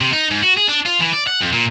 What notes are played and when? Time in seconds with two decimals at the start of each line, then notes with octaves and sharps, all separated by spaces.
0.01 C3
0.13 D#4
0.31 G#2
0.43 F#4
0.57 G#4
0.68 D4
0.85 F4
1.00 E3
1.13 D5
1.27 F#5
1.41 F2
1.52 A#2